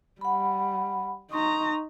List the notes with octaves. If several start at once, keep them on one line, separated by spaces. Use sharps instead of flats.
G3 F#5 B5
D#4 A#5 C6 C#6 D#6